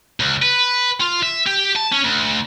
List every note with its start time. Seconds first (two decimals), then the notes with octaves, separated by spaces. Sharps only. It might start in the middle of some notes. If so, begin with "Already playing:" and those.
0.20 C#2
0.42 B4
1.01 F4
1.23 E5
1.47 G4
1.76 A5
1.92 C#4
2.04 D2